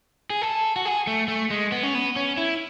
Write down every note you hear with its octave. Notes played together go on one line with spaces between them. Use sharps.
G#4
A4
F#4
G#4
A3
A3
G#3
B3
C#4
B3
C#4
E4